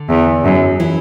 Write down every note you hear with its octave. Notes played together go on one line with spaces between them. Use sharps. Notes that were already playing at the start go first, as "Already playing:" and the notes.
Already playing: D3 D4
E2
F#2
E3 E4